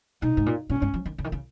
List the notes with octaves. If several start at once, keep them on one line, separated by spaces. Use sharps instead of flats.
B2 D#4
G#2
A#2
A#2 C#4
G#2
F3
D#3
C#3
D#3
C#3